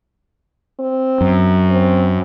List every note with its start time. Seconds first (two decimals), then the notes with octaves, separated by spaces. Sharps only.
0.80 C4
1.21 F#2
1.71 C4